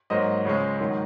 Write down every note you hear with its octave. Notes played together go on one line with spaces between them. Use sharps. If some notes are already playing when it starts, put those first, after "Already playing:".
G#2 F#3 A#3 C5 D#5
C#2 C#3 G#3
G#2 D#3 F#3 A#3